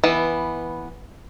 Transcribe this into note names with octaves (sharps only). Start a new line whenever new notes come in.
E3 B3